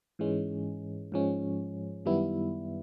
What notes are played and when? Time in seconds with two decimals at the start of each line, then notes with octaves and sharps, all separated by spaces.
0.19 G#2 E3 G#3 C#4
1.12 G#2 F3 G#3 C#4
2.06 F#2 D#3 G3 B3 E4